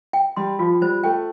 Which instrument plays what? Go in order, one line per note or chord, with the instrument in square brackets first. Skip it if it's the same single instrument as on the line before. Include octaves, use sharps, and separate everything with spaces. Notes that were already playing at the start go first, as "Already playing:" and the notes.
[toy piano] G5
[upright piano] G3 [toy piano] C6
[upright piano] F3 [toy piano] F4
[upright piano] G3 [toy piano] C5
[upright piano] A3 [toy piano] G5